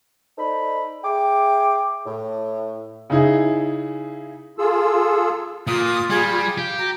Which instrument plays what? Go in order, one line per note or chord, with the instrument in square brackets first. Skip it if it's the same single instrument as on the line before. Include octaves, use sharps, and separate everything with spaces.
[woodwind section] D#4 A4 C5 D5 B5
G#4 E5 G5 D6
A2
[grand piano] C#3 D#4 E4 G#4
[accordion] F4 G#4 A4 E6
[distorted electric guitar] A#2 [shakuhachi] F4 [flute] D#6
[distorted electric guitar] G3 [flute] G#4
[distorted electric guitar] G4 [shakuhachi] F5
[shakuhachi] F#4 [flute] A#5